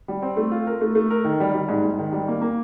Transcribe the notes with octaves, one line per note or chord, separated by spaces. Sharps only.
G3
C4
A3
F4
A#4
A3
A3
A#4
D#3
G3
G3
G#2
G#2
D#3
G3
A#3
A#3